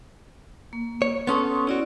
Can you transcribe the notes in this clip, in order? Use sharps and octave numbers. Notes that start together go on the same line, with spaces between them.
A#3
C#5
B3 C#4 A4 C6 C#6 D#6
C#4 E4 F#4 D5